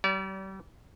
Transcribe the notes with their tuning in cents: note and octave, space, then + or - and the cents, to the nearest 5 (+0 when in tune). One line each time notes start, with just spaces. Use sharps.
G3 -35 D5 -40